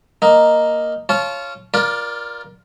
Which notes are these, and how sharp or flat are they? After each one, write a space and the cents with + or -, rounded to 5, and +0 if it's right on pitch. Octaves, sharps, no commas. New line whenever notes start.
A#3 +0 D#4 +0
F4 -15 C#5 +0 A5 -25
F4 +0 A#4 +25 D5 +0